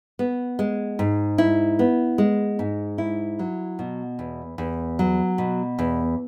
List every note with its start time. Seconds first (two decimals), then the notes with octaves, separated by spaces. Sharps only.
0.19 B3
0.59 G#3
0.99 G#2
1.38 E4
1.79 B3
2.18 G#3
2.59 G#2
2.98 E4
3.39 F#3
3.79 B2
4.19 E2
4.58 E2
4.99 F#3
5.38 B2
5.79 E2